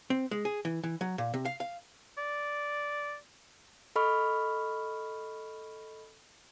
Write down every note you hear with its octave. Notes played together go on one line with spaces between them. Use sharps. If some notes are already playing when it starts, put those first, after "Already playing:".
C4
G#3
G#4
E3
E3
F#3
A#2
C3
F5
F5
D5
A4 D#5 B5 C#6 F6